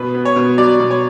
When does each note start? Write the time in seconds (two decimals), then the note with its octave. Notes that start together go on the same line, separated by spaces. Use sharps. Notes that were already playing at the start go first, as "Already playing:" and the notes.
Already playing: B2 B4
0.15 B3
0.25 C#5
0.36 B2
0.58 F#3 D5
0.80 B2
0.91 C#5